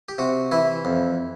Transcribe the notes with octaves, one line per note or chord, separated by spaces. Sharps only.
G4
C3 F#4
E3 E4
F2